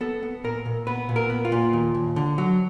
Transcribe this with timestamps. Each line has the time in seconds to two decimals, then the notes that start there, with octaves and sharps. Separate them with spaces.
0.01 B3 A4
0.23 B3
0.44 A#2 A#4
0.66 A#2
0.87 B3 B4
1.09 A#2
1.16 A#4
1.30 B3
1.45 F4
1.52 A#2
1.73 D#2
1.95 D#2
2.16 D3
2.38 F#3